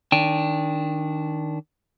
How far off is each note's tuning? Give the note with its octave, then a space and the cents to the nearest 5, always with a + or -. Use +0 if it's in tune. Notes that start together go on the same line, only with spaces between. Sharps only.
D#3 +0 D4 -20 G5 +5